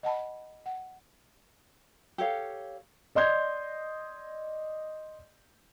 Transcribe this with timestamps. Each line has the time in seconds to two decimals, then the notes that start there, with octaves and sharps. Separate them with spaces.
0.03 D#5 F#5 A5 B5
0.66 F#5
2.18 G4 A4 C#5 F5
3.15 D5 D#5 C6 G6 G#6